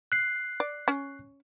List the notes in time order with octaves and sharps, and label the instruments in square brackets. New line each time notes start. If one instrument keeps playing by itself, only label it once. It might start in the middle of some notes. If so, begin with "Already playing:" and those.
[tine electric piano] F#6 C7
[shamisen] D5
C#4